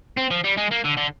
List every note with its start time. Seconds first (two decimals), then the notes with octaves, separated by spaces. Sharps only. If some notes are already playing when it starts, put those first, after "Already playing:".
0.17 C4
0.31 F3
0.44 G3
0.57 G#3
0.71 A#3
0.84 D3
0.97 D3